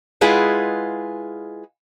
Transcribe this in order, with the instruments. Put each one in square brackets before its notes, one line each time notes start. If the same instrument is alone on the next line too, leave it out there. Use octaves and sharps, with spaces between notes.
[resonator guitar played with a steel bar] G#3 E4 F4 G#4 B4 F#5